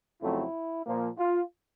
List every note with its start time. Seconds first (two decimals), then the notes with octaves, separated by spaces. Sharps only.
0.21 F2 C#3 F#3 A3 C4 E4
0.86 A#2 F3 A#3
1.18 F4